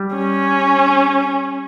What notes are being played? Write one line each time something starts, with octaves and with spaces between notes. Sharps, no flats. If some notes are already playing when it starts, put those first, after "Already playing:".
Already playing: G3
C#4